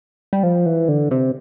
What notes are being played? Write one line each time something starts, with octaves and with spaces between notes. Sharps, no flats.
G3
F3
E3
D3
C3